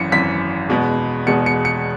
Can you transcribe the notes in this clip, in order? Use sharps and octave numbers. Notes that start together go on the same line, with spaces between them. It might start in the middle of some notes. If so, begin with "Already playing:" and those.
Already playing: G#1 F#2 E3 C#7
G#1 F#2 E3 B6
E2 B2 G#3 B3
E2 B2 G#3 B3 C#7
C#7
C#7